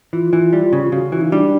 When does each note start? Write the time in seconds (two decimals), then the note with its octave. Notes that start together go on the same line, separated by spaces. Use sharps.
0.13 E3 F4
0.33 E3
0.53 G3
0.73 C#3
0.92 C#3 F#4
1.12 E3
1.21 D#4
1.32 G3 D4